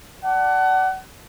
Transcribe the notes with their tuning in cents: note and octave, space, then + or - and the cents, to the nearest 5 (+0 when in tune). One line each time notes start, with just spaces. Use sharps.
D5 +0 F#5 +25 A5 +0